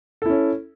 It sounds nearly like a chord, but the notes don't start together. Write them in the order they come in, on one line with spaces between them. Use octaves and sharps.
A4 E4 C#4